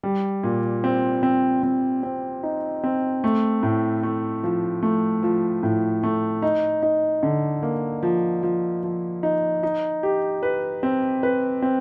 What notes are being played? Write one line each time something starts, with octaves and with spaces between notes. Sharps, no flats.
G3
A#2
C4
C4
C4
C4
D#4
C4
A3
A2
A3
F3
A3
F3
A2
A3
D#4
D#4
D3
A#3
F3
F3
F3
D#4
D#4
G4
B4
C4
B4
C4